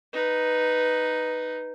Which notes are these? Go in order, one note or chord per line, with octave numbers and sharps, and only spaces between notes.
D#4 B4